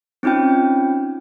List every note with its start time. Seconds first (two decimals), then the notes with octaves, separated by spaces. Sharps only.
0.23 C4 C#4 D#4 F4 G5